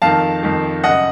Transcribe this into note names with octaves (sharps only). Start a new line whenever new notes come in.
F2 D#3 F5 A5
F2 D#3
F#2 C#3 D#5 F#5